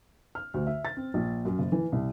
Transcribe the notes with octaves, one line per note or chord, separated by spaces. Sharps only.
F6
D2
E5
A6
C4
A#1
F#2
F#1
E3
C2